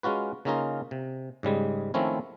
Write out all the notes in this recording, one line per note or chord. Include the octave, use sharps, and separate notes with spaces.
G#3 C#4 F4 F#4 B4
C#3 A#3 C#4 D#4 F4 A#4
C3
G#2 C#3 G3 G#3
D#3 F3 A3 C4 C#4 E4